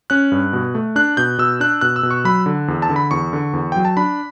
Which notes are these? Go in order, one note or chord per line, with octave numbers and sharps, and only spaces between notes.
C#4 F#6
G2
B2
A3
D4 F#6
B2 G6
B2 E6
D4 F#6
B2 F#6
E6
B2
C#6
F#3 B5
D3
E2
A5
D3
B5
E2 C#6
D3
E2
F#3 G5
A5
D4 B5